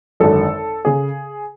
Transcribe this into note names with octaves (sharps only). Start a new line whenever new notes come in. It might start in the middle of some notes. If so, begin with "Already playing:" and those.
G#1 F#2 D3 A4
C#3 G#4